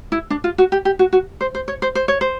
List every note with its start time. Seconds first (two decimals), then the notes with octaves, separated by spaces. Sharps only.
0.12 E4
0.30 D4
0.44 F4
0.58 F#4
0.72 G4
0.85 G4
0.99 F#4
1.13 F#4
1.41 C5
1.55 C5
1.68 C#5
1.82 C5
1.95 C5
2.08 C#5
2.21 C5